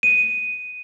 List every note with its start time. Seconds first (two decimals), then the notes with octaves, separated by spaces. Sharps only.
0.03 D#7